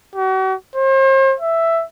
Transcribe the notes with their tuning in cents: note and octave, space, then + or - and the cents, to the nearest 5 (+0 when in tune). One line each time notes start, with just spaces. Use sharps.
F#4 +40
C5 +40
E5 +5